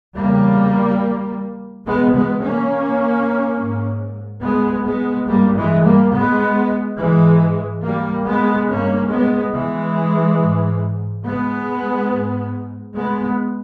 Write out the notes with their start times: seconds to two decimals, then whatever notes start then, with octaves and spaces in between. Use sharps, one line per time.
0.16 E2 C#3 G3 A#3
1.87 E2 B2 G#3 B3
2.15 G#3 B3
2.43 A#3 C#4
3.58 G#2
4.43 G#3 B3
4.86 G#3 B3
5.28 G2 G3 A#3
5.57 E3 G#3
5.85 G3 A#3
6.13 G#3 B3
6.99 G#2 E3 G#3
7.84 G3 A#3
8.26 G#3 B3
8.69 G2 A#3 C#4
9.12 G#3 B3
9.55 E3 G#3
10.40 G#2
11.26 G#3 B3
12.11 G#2
12.96 G#3 B3